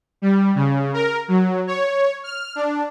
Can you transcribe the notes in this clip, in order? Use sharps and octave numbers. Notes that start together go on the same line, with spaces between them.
G3
C#3
A#4
F#3
C#5
F6
D4